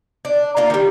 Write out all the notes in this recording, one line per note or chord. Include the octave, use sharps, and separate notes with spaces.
D4
A#3 D4 F4
D#3 G3